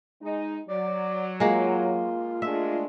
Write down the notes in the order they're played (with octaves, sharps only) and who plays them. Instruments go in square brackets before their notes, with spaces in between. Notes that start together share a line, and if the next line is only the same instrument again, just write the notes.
[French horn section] G#3 D#4
[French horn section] F#3 [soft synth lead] D5
[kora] G#3 A#3 [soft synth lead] F4
[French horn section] G#3 A3 D4 [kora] E5